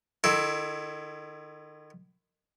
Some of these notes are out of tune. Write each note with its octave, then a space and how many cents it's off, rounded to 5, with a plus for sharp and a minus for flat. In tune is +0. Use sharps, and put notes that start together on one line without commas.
D#3 -30 E4 +20 A4 -5